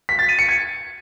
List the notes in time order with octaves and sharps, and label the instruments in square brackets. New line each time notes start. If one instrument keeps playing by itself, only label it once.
[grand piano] B6
A6
D#7
C#7
G#6